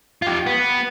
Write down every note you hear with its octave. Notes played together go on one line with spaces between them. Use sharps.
F4 G4
B3